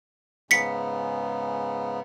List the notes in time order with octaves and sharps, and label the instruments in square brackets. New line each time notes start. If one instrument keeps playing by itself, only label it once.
[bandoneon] G#2 C#3 B3 [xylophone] B6 C#7